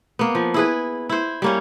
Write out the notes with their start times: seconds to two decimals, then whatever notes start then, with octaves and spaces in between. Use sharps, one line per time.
0.19 A#3 B3
0.35 F3
0.54 E4 G#4 B4
1.09 E4 C5
1.42 G3 A#3 C#4